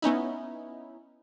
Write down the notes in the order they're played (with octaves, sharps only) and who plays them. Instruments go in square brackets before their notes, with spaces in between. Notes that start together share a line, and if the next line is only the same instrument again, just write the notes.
[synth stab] B3 C#4 D#4 E4